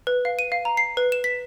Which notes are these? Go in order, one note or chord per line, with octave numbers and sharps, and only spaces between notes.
B4
F5
D#7
F5
A#5
C7
B4
E7
B6